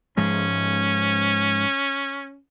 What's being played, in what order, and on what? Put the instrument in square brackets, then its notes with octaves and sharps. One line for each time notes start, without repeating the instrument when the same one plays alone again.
[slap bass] G#2 F3 G#3 [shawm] C#4